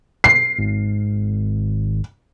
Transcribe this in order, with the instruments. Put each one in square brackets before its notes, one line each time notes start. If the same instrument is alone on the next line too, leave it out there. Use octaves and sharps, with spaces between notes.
[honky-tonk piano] C7
[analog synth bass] G#1